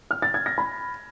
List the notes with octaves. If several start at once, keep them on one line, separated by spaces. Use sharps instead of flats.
F6
A6
G#6
A#6
B5